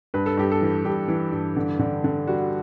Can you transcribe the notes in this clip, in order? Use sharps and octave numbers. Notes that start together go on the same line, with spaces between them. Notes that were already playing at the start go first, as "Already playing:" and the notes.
G2 B4
A4
G2 G4
A4
E3
G2 G4
E3
G2
D3
D3
D3
G3 F#4